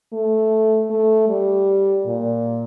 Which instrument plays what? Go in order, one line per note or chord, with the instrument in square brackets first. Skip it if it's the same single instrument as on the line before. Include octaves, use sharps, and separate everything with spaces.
[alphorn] A3
A3
G3
A#2